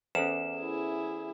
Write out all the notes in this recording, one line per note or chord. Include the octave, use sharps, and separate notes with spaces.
E2 C#4 A4 C5 E7
E4 G#4